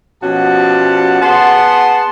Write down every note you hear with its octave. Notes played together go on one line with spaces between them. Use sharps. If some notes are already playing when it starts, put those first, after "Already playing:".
B2 F3 C#4 F#4 G4 A5
B3 G#4 F#5 A5 C6